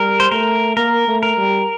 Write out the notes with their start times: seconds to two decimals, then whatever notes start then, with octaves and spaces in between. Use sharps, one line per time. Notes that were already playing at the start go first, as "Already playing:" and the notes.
Already playing: G3 A#4
0.20 C5
0.31 A3 A#4
0.77 A#3 A#4
1.08 A3
1.23 A#4
1.38 G3